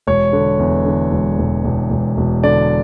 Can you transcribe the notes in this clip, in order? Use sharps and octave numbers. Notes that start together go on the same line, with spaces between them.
E1 C#5
D3
E2
D3
E1
E1
E1
E1
E1
D3 D5